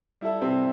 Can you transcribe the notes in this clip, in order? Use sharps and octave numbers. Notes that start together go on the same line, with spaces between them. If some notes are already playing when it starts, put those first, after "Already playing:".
G3 E4 A4 E5
C3 C4